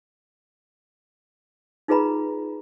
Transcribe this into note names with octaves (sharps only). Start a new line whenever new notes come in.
D#4 F4 G#4 B4 A#5 B5